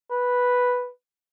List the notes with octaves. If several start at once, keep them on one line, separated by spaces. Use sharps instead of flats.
B4